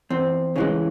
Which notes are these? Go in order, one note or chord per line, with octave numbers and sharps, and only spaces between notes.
E2 C4
C#3 E3 G#3 C#4